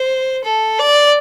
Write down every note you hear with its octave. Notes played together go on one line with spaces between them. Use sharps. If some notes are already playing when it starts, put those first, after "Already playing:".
Already playing: C5
A4
D5